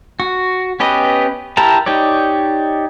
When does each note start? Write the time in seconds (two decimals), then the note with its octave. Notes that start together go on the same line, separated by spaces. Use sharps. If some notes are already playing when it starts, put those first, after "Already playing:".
0.20 F#4
0.80 B3 C#4 G4 B4 D#5
1.57 E4 G4 A#4 A5 A#5
1.86 D#4 G4 C#5 D5